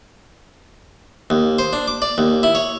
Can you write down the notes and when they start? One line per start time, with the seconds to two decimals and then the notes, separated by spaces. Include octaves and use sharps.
1.30 D#2
1.59 C5
1.73 D4
1.88 D6
2.02 D5
2.18 D#2
2.43 E4
2.55 C#5